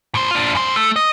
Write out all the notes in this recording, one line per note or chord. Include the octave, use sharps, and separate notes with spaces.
A2 C5
D4 F4
F#2 C5
A3
D#5